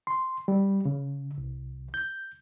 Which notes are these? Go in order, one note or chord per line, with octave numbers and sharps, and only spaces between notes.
C6
G3
C#3
C2
G6